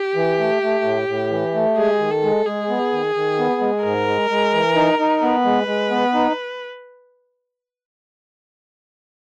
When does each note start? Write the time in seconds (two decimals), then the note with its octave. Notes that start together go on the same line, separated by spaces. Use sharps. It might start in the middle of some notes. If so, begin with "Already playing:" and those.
Already playing: G4
0.15 E3
0.39 A3
0.62 A3
0.84 A2
1.08 A2
1.30 E3
1.54 A3
1.77 G#3 G#4
1.99 D#3
2.11 A4
2.23 G#3
2.46 G#3 G#4
2.69 B3
2.92 D#3
3.15 D#3
3.38 B3
3.61 G#3
3.84 G#2 A#4
4.07 G#3
4.30 G#3
4.53 E3
4.75 D#4
4.99 D#4
5.22 B3 B4
5.45 G#3
5.68 G#3
5.90 B3
6.14 D#4